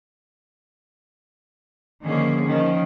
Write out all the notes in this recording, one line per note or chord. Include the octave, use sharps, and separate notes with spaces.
D3 D#3 F3 A#3 C#4 G#4
D#3 F3 C#4